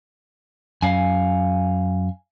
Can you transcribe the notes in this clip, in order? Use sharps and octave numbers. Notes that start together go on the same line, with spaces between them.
F#2 F5 G#5